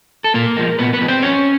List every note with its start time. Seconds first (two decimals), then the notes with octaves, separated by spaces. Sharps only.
0.24 A4
0.34 A#2 A#3 A#4
0.57 F3 G#3
0.79 A#2 B3 B4
0.93 B3 B4
1.01 F3 G#3
1.08 C4 C5
1.22 F2 C#4 C#5